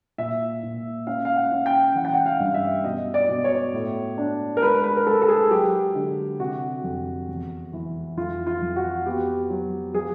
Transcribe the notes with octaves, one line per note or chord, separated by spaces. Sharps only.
A#2 E5
A#2
C#4 F5
F5
F#5
C#4
G5
E3 F#5
G5
F#5
F5
G2
E5
B2 D#5
D5
B2
C#5
A2
D4
A#4
G#3 B4
B4
A#4
G#3 A4
A4
G#4
F#3 G4
D3
C3 F#4
F2
E2
E3
F2 F4
F4
F2
F#4
B3 G4
F#3
F3 G#4